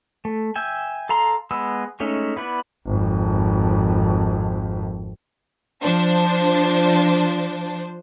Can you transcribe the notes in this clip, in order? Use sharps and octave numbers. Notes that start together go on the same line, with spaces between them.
A3
E5 G5 G#5
A4 F5 A#5 C6
G#3 B3 E6
G#3 A3 C#4 D#4 E5
B3 E4 B4 D5
G#1 F2
F3 D4 C5